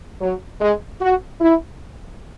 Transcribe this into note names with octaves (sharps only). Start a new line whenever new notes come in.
F#3
G#3
F#4
E4